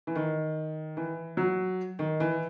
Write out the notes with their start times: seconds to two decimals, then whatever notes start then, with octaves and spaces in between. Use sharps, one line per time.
0.07 E3
0.15 D#3
0.97 E3
1.37 F#3
1.99 D#3
2.20 E3